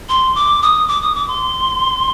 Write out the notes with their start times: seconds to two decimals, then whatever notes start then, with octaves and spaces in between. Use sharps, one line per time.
0.09 C6
0.35 D6
0.62 D#6
0.88 D6
1.02 D#6
1.15 D6
1.28 C6